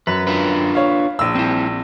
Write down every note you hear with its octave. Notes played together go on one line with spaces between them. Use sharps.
F#2 B4
D4 F4 B4
C#5 F5
A#1 E6
C4 E4